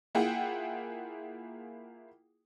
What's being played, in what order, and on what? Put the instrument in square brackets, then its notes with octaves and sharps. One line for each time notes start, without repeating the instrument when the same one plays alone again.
[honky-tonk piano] A#3 E4 F4 G#4 F#5 G5